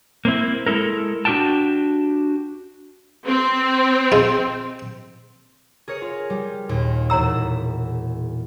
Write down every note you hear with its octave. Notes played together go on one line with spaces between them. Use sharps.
A#3 C4 E4
G#3 E4 A4 A#4
D4 F#4 G4 A#4 G5 A5
C4
D#4 F4 G#4
G#4 A#4 C#5
F4
G3
D#2 A#2
E1 E4 C#5 A#5 E6 E7